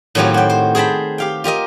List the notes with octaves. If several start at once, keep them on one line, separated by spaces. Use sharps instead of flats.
A2 D#3 F#3 C4 F4 G4
F#4 G5
C5
G#4 C5 G5 A5 B5
G4 F5 G5
F4 G4 A#4 D#5